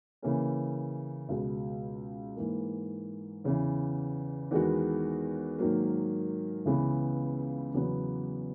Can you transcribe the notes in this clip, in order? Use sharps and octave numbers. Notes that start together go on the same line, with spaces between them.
C#3 E3 A#3 C#4
C#2 B2 G#3
G#2 E3 A#3
E2 C#3 E3
E2 D#3 G#3 B3 F#4
G#2 D#3 F#3 A#3
C#2 C#3 E3 B3
E2 C#3 F#3 B3